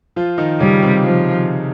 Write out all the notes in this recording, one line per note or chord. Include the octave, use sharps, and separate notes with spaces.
F3 F4
D#3 D#4
C#3 G3 C#4
C3 C4
F3